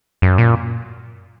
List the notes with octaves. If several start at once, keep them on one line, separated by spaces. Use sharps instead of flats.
F#2
A#2